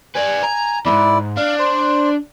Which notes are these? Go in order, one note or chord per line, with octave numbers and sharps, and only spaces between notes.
B4 D5 G#5
A#5
E2 G#2 E4 D5
D4 F5
C5